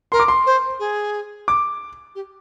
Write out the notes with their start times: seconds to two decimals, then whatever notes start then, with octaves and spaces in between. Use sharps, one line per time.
0.12 A#4 C6
0.20 D6
0.28 C6
0.46 C5
0.79 G#4
1.48 D6
2.15 G4